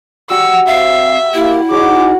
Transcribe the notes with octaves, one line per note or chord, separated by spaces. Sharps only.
G3 F#4 F#5 E6
C4 E5 F5
A#3 E4 G4
F#3 D#4 G#4 D6